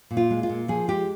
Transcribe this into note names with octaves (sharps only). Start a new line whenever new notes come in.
A#2
F4
G#3
F4
A#2
F3 G#4
G#3 G4